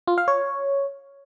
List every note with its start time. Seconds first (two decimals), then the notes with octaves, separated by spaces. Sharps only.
0.08 F4
0.18 F5
0.28 C#5